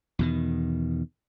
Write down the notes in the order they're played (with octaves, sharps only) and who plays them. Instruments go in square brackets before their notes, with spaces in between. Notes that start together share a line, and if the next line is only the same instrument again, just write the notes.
[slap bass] E2 B2 D#3